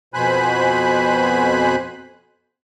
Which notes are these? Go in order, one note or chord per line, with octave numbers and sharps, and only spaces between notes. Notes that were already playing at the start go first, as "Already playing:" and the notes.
F2 B2 C5 G#5 B5 F#6